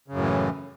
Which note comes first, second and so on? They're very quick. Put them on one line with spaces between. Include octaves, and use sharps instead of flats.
C#3 F#2 A2 E3